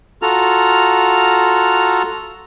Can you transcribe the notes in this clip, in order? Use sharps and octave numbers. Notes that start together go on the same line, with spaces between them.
F4 F#4 A4 A#5 F6